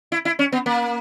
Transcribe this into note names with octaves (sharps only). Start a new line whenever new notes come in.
E4
E4
C#4
B3
A#3